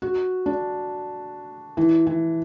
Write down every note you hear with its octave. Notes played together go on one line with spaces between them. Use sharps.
F#4
D4
E3
E3